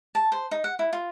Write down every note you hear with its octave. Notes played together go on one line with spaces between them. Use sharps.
A5
C5
D#4
F#5
E4
F4